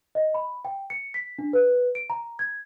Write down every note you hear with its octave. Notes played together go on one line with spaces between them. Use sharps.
D#5
B5
G5
C#7
B6
D4
B4
D7
A#5
G#6